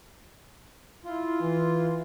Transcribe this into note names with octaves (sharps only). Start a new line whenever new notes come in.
E4 F4
E3